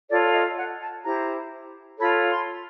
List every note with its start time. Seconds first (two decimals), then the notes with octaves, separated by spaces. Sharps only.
0.09 F4 A4 C#5 D5
0.34 D#5
0.57 F#5
0.81 A5
1.04 E4 G4 C5 A#5
1.99 F4 A4 C#5 B5
2.31 C6